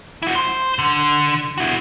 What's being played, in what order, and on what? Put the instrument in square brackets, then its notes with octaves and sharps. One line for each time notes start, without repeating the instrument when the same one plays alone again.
[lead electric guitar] E4 F#4
C5
D3
E4 F#4